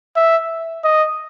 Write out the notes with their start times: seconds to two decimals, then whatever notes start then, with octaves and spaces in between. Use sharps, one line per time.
0.16 E5
0.84 D#5